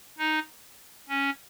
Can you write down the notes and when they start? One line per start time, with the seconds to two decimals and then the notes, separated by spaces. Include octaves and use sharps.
0.18 D#4
1.09 C#4